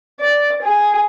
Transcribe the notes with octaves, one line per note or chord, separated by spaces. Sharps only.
D5
G#4